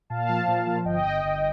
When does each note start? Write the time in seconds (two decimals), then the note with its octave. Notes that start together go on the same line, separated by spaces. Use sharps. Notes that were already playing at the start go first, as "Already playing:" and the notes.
0.10 A#2 F5 A5
0.29 F3
0.48 A#2
0.67 F3
0.85 G1 D#5 G5
1.05 G1
1.24 G1